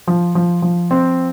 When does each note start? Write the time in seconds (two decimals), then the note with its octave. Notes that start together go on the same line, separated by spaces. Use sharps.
0.07 F3
0.35 F3
0.62 F3
0.91 C4